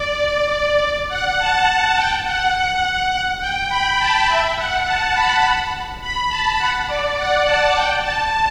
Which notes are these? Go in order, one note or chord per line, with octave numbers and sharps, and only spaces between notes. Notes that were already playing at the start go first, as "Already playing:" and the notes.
Already playing: D5
D5
F#5
A5
A5
G5
F#5
F#5
G5
B5
A5
E5
F#5
A5
B5
B5
A5
F#5
D5
F#5
A5
G5
A5